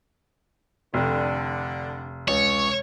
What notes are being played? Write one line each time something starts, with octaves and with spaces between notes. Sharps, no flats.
F1 D3
C#2 C#5